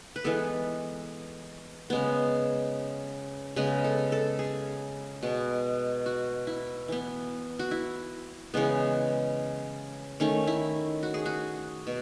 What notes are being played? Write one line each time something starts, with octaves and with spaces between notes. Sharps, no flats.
B4
E3 G#3 B3 A4
C#3 G#3 B3
C#3 G#3 B3 B4
A4
A4
G#4
B2 G#3 B3
F#4
E4
E3 B3
F#4
E4
C#3 E3 G#3 B3
D#3 A3 C#4
E4
F#4
G#4
F#4
B2